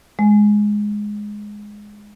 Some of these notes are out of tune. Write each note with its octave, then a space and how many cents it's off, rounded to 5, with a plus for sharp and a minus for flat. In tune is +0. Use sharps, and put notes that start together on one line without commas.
G#3 +0